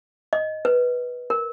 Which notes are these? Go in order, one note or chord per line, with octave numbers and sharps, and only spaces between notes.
D#5
B4
A#4